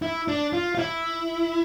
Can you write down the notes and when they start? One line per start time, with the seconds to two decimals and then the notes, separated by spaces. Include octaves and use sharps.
0.02 E4
0.28 D4
0.53 F4
0.75 F4
0.79 E4